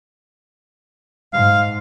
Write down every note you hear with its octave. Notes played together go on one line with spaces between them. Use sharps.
G#2 F5